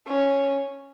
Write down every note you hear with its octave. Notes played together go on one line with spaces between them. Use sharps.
C#4